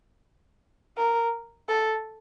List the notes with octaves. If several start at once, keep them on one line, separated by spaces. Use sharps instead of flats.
A#4
A4